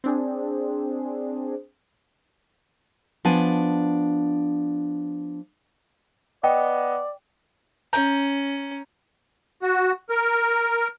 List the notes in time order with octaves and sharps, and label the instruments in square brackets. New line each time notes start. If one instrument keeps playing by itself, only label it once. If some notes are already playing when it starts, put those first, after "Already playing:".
[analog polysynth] C4 D4 G#4
[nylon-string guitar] F3 B3 D4 G#5
[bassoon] B3 [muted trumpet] D5 [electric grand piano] D#5 [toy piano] G5
[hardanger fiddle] C#4 [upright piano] A#5 G6
[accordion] F#4
A#4